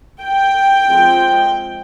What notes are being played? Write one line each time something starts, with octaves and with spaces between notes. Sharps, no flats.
G5
F3 G#3 C4